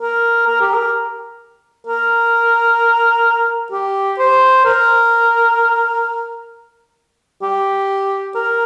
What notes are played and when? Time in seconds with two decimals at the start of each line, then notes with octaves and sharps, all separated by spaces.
0.01 A#4
0.47 A#4
0.61 G4
0.74 A#4
1.86 A#4
3.72 G4
4.19 C5
4.65 A#4
7.43 G4
8.35 A#4